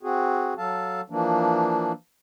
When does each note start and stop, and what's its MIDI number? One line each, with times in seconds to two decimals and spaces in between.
0.03 0.54 60
0.03 0.54 66
0.03 0.54 68
0.58 1.01 54
0.58 1.01 69
0.58 1.01 77
0.58 1.01 81
1.10 1.92 52
1.10 1.92 53
1.10 1.92 58
1.10 1.92 62